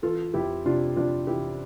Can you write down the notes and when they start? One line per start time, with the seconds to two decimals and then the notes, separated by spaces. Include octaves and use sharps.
0.02 E3 F4 A4
0.34 F2 E4 G4
0.65 C3 D4 F4
0.96 F2 D4 F4
1.27 E3 E4 G4